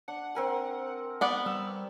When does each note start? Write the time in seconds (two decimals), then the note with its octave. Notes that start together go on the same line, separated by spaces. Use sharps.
0.08 D4 F#5
0.35 C4 A#4 G#5
1.21 B3 D5 F#5
1.46 G3 E6